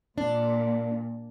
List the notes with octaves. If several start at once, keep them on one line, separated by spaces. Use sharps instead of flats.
A#2 D4